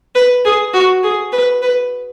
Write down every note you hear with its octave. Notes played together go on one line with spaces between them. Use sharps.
B4
G#4
F#4
G#4
B4
B4